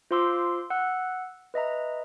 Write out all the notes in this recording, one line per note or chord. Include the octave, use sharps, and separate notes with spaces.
F4 C5 F5 C6 D6 E6
F#5 E6 F#6
B4 D#5 E5 A#5